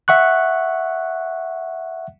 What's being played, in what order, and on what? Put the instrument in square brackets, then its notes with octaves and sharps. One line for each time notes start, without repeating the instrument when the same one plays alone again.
[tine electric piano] E5 F#5 C#6 F#6